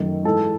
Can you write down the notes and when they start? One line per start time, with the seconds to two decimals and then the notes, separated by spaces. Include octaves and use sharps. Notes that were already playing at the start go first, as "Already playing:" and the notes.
Already playing: F#2 D#3 A3
0.24 G#2 E3 G#3 A4